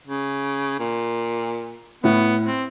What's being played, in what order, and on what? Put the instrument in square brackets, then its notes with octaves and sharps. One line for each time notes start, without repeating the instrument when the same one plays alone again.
[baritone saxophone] C#3
A#2
[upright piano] A2 [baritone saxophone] B3
[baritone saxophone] C4